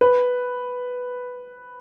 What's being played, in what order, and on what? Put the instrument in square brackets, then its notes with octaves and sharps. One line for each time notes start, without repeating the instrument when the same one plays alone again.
[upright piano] B4